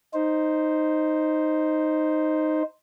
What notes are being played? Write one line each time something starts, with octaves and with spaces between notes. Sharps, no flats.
D#4 C5